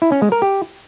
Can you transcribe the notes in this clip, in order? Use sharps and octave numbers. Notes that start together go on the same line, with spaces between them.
E4
C#4
G#3
A#4
G4